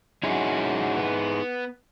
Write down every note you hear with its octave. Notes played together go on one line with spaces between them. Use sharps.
C#4 D#4 E4 F#4 G#4
B3